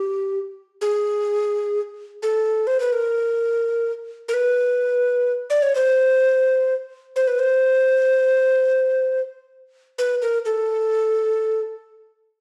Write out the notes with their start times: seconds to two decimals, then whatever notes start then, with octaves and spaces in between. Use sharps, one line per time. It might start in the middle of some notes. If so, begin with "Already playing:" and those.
Already playing: G4
0.81 G#4
2.23 A4
2.67 C5
2.80 B4
2.93 A#4
4.28 A#4
4.34 B4
5.50 D5
5.62 C#5
5.75 C5
7.16 C5
7.28 B4
7.39 C5
9.98 B4
10.22 A#4
10.45 A4